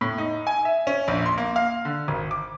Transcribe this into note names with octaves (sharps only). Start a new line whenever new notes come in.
A2
D#4
G#5
E5
C#4
A#1
C6
A#3
F5
D3
G#1
D6